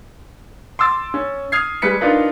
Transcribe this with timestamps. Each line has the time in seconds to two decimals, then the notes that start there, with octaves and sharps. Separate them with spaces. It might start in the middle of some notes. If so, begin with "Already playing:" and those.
0.79 C6 D6 E6 A6
1.14 C#4
1.52 D#6 F6 G#6 C7
1.82 G3 G#3 B4 B6 C#7
2.01 D4 D#4 F4 A#4 B4